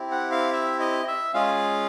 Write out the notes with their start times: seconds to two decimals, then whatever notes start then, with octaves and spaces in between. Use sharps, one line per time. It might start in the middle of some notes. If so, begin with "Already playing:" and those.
Already playing: C4 E4 G4
0.11 F#5
0.32 F5
0.53 E5
0.80 D#5
1.07 E5
1.34 G#3 C#4 F4 G#4 F5